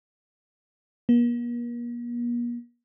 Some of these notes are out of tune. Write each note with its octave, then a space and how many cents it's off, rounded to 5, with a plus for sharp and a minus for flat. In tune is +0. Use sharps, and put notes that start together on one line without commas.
A#3 +45